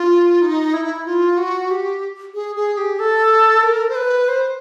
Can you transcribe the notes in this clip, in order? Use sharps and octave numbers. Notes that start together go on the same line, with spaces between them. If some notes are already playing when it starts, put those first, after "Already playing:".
Already playing: F4
D#4
E4
F4
F#4
G4
G#4
G#4
G4
A4
A#4
C5
B4
C5